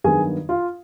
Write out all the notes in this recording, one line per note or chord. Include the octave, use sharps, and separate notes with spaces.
G2 D#3 F#3 B3 G#4 G#5
F4 F5